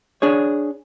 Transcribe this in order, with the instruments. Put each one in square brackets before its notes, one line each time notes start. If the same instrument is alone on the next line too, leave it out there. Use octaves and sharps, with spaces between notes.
[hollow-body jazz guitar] D4 G#4 C#5